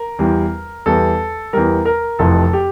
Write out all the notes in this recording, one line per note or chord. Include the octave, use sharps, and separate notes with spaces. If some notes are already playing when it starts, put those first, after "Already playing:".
Already playing: A#4
E2 E3 G3
E2 E3 G3 A4
E2 E3 G3 A#4
A#4
F1 F2 C3 E3 A4
G4